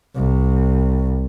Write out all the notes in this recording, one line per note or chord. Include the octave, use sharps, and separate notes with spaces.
C2